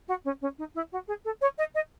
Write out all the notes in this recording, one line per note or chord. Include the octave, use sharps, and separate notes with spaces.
F#4
C#4
C#4
D#4
E4
F#4
G#4
A4
C#5
D#5
D#5